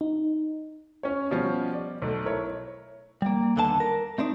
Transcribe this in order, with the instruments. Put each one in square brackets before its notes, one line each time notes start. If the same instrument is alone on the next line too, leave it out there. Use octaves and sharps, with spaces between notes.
[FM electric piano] D#4
[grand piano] C#4 C#5
B2 F3 G3 C#4
D5
B1 A3
E4 A#4 C#5
[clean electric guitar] G3 A#3
D#2 D3 B3 F#5 A5
A#4
A3 C4 D4 D#4